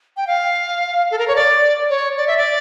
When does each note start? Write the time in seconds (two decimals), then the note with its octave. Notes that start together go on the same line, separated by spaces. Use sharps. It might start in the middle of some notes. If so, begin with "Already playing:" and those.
0.17 G5
0.27 F5
1.11 A4
1.19 A#4
1.28 C#5
1.36 D5
1.90 C#5
2.17 D5
2.27 E5
2.37 D5